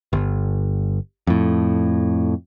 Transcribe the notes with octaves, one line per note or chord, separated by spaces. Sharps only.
G1
F2 A2